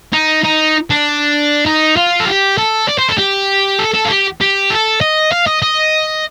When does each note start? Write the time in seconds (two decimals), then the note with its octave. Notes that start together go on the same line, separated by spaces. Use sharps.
0.13 D#4
0.43 D#4
0.90 D4
1.66 D#4
1.97 F4
2.20 A4
2.27 G4
2.58 A4
2.89 D5
2.99 C5
3.09 A4
3.18 G4
3.79 A4
3.94 A4
4.05 F4
4.10 G4
4.41 G4
4.70 A4
5.01 D#5
5.32 F5
5.47 D#5
5.62 D#5